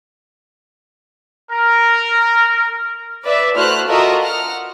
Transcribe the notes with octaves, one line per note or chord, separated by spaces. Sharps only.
A#4
B4 D5 E5
A3 E4 F#4 C5 F6 F#6
F4 F#4 A4 A#4 D#5 E5
F#5 F6